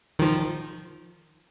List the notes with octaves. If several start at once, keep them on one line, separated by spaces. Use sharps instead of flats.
D#3 F3